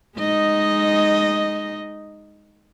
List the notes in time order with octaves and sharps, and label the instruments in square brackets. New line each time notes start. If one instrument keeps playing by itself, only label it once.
[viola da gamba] G#3 D#4 D#5